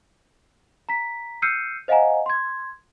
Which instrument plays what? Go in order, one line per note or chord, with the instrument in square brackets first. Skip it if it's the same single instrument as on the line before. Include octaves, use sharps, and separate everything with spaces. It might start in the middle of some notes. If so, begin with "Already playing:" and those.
[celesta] A#5 B6
E6 F6 G6 C7 C#7 D#7
C5 D#5 F5 F#5 G#5 A#5
C6 G#6